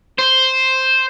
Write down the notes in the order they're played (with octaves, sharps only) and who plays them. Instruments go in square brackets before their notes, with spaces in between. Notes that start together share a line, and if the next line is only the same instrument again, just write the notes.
[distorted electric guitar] C5